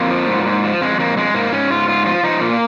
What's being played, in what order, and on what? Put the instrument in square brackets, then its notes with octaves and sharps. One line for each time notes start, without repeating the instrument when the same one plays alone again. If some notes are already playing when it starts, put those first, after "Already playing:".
Already playing: [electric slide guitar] F2 A#3
F3
G#2
G#2
F3
F2 G#3
F2 A#3
F2 G#3
G#2 A#3
G#2 C#4
G#2 F4
G#2 F4
F3 F4
F3 D#4
A#2 A#3